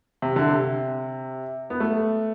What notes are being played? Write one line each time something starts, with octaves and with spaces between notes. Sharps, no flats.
C3
D3
C3
B3
A3